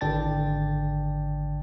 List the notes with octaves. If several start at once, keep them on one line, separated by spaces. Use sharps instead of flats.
G#1 D3 D5 G5 A5 A6